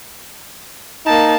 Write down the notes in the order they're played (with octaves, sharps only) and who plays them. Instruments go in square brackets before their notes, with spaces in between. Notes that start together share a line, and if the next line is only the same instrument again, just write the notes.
[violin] A#3 A5 [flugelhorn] D#4